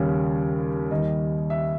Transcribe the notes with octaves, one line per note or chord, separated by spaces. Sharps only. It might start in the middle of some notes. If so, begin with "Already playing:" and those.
Already playing: D#2 C#3 G3
D#2 D#3 G3 D#5
E5